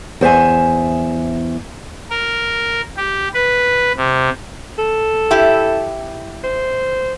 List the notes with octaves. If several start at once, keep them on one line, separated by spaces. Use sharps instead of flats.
E2 C5 E5 G#5
A#4
G4
B4
C3
A4
E4 G4
C5